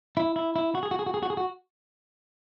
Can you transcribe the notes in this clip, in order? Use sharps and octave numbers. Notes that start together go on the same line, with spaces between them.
E4
E4
E4
F#4
G#4
F#4
G#4
F#4
G#4
F#4
G#4
F#4